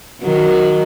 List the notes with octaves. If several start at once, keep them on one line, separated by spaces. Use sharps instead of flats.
D#3 F#3